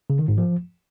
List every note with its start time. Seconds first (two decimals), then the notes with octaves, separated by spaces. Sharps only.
0.10 C#3
0.19 D#3
0.28 G#2
0.38 F3